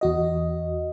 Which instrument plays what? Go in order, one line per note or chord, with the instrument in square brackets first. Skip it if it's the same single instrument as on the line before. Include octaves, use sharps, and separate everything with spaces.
[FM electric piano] E2 F#4 D#5